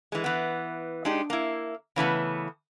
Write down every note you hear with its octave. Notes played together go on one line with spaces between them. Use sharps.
E3 G#3
E3 B3
G#3 D4 D#4 G4
A#3 E4
C#3 E3 A3 B3